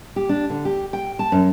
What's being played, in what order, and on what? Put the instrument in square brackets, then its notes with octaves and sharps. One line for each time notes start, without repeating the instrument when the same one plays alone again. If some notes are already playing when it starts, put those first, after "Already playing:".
[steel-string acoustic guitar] G4
D4
D3
G4
G5
A5
F#2